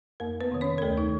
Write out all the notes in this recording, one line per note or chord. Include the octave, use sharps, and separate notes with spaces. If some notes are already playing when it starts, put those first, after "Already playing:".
F2 A#3 A#4
B3 B4
C3 D#3
C#4 C#5
A#4
D2 A3 A4
D#3 D#4